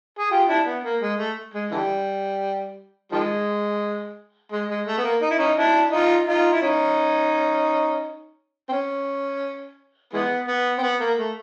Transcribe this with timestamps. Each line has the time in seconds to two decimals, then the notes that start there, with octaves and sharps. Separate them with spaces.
0.19 G#4
0.31 F4 G4
0.48 D4 E4
0.66 B3
0.84 A#3
1.01 G#3
1.18 A3
1.54 G#3
1.71 D3 E3 G3
3.12 D#3 F3 G#3
4.52 G#3
4.69 G#3
4.86 A3
4.98 B3
5.04 A#3
5.22 D#4
5.30 E4
5.38 C#4 D#4
5.57 D4 E4
5.92 D#4 F4
6.27 D#4 F4
6.53 E4
6.62 C#4 D#4
8.69 C4
8.72 C#4
10.13 E3 G#3 B3
10.48 B3
10.78 C4
10.83 B3
11.00 A#3
11.18 A3